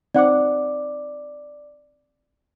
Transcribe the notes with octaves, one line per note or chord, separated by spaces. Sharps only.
C4 D#4 D5 F#5 D6